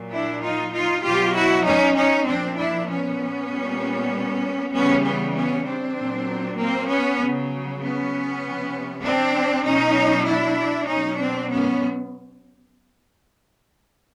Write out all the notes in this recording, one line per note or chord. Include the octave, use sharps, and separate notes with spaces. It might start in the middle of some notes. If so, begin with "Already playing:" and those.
Already playing: A#2 F#3
D4 E4
D#4 F4
D#4 F4
B2 F#3 F4 G4
E4 F#4
C#4 D#4
C#4 D#4
A#2 F3 C4 D4
D4 E4
B3 C#4
A#2 G3
C#3 E3 G3 B3 C#4
B3 C#4
B3 C#4
C4 D4
A#2 F#3
A#3 C4
B3 C#4
C#3 F#3
B3 C#4
C3 F3
C4 D4
B2 F#3 C#4 D#4
D4 E4
B2 F#3 C#4 D#4
C4 D4
B3 C#4